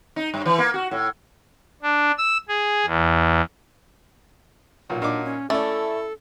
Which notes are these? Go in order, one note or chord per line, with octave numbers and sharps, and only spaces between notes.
D#4
G2
E3
A#3
F#4
A2
D4
E6
G#4
E2
B1 A#2 F#3
A#2 D4 D#4 D6
C#4
A3 C#4 E4 A4 D5